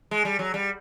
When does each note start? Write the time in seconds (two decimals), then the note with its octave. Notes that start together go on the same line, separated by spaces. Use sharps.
0.11 G#3
0.25 G3
0.39 F#3
0.54 G3